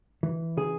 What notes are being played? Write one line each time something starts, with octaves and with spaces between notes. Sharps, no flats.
E3
C#3 G#4